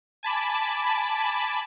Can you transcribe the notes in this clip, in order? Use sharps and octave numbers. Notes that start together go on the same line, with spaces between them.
G#5 A5 B5 D6